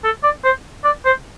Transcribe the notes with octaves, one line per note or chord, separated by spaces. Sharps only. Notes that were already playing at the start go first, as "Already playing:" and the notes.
A4
D5
C5
D5
C5